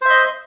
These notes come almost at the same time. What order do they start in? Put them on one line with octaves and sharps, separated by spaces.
C5 E5 D#5